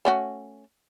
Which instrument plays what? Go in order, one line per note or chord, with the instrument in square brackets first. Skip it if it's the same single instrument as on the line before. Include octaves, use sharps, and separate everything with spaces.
[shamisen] A3 C#4 F#4